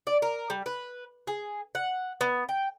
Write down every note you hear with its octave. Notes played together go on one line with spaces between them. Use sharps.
D5
A#4
G3
B4
G#4
F#5
B3
G5